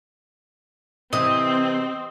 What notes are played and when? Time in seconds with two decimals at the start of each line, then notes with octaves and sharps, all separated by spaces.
1.13 C3 E3 C4 D#5